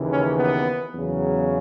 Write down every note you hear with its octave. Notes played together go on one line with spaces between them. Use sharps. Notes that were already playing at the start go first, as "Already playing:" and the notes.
Already playing: D#2 C#3 E3
C#4
B3
E2 C#3 F#3